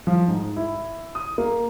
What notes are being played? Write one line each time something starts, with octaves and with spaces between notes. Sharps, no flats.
F3
G#2
E4
D#6
A#3